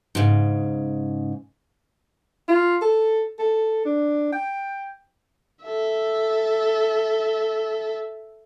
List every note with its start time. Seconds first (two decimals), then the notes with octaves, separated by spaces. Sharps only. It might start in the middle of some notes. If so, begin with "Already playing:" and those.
0.15 G#2 C#3
2.48 F4
2.82 A4
3.39 A4
3.85 D4
4.32 G5
5.64 A4 E5